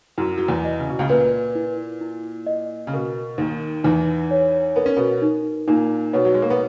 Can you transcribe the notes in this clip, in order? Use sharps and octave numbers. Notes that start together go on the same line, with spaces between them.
F#2 F#3 E4
F#3
E2 E3
D#5
C#3
B2
C#2 C#3
A#2 B4
E4
E4
D#5
C#3
B2 A#4
D#2 D#3 D#4
E2 E3 D#4
C#5
B3 A#4
C#4
B2 B3
D#4
A#2 A#3 D#4
B2 B3 C#5
F#3
G#3
A#3
B3